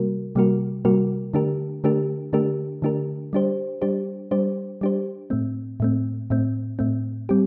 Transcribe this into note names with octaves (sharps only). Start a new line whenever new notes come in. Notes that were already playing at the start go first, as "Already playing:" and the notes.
Already playing: C3 G3 A#3 F#4 A#4
C3 G3 A#3 F#4 A#4
C3 G3 A#3 F#4 A#4
D3 A3 D4 G4 A#4
D3 A3 D4 G4 A#4
D3 A3 D4 G4 A#4
D3 A3 D4 G4 A#4
G3 D4 G4 C5
G3 D4 G4 C5
G3 D4 G4 C5
G3 D4 G4 C5
A2 A3 C4
A2 A3 C4
A2 A3 C4
A2 A3 C4
G3 C4 G4